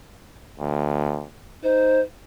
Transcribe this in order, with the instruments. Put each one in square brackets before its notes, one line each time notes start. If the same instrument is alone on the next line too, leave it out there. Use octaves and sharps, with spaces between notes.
[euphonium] D2
[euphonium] D#4 [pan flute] C5